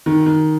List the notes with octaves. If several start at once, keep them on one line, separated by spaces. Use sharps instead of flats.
D#3
D#3